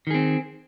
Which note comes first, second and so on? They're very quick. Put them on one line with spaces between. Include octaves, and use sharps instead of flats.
D#3 G#4 C4